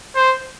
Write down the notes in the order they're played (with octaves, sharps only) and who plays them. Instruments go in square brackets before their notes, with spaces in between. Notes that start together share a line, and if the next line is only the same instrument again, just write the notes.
[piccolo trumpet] C5